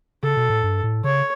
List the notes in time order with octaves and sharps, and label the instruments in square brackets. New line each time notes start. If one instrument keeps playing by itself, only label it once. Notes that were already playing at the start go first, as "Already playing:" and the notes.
[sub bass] C#3 [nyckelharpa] A4
[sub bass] B2
A2
G2
A2
[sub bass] C#3 [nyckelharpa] C#5